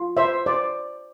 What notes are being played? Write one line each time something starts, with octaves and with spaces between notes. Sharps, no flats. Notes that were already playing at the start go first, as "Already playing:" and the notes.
Already playing: F4
C5 E5
C5 D5